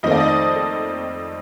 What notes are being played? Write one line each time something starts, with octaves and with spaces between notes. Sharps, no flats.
F2 D#3 A3 C4 D#4 D#5
D5
D#5
A4